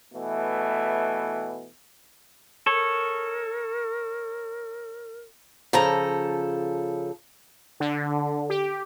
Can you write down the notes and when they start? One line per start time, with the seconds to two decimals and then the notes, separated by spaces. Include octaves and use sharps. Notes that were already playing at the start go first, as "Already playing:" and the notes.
0.14 B2 E3 A3
2.66 A4 A#4 C#5
5.73 C#3 F3 A4 A#5
7.80 D3
8.50 G4